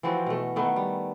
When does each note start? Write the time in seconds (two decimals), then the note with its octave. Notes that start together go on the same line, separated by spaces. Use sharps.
0.03 E3 F3 C4 F#4
0.26 B2 A3
0.56 D#3 A3 B3
0.76 G3